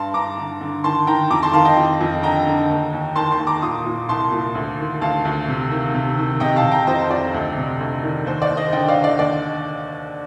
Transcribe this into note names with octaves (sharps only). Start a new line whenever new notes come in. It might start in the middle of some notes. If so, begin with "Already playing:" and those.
Already playing: G2 A5 C6
G2 A#5 D6
D3
D3
D#3 A5 C6
D#3 G5 A#5
F2 A#5 D6
A5 C6
D#3 F5 A5
D#5 G5
F2
F2
D3 G5 A#5
D3
D#2
D#2
D#3 A5 C6
A5 C6
D#2
A#5 D6
A#2 C6 D#6
A#2
C2 A5 C6
A#2
D2
D#3
D2 F5 A5
D2
C3
D#3
C3
D#3
C3 D#5 G5
F5 A5
C3
G5 A#5
F2 C5 D#5
F2 D5
D2
C3
D2
D#3
D#2 C5
D5
D#2
C5 D#5
D3 D#5 G5
D5 F5
D3
D5
D#2 D5